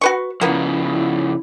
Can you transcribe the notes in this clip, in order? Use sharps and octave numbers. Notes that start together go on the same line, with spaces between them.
F#4 B4 C#6
C#3 F3 A#3 B3 E4